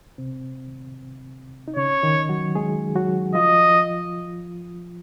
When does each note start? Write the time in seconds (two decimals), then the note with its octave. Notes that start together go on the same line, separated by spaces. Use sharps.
0.18 C3 C4
1.68 D#4
1.76 C#3 C#4 C#5
2.03 D#3 D#4
2.29 F#3 F#4
2.55 G#3 G#4
2.95 F#3 F#4
3.35 F3 F4 D#5